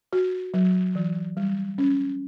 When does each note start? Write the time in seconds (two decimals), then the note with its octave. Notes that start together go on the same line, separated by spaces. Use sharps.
0.13 F#4
0.54 F#3
0.95 E3
1.37 G3
1.78 C#4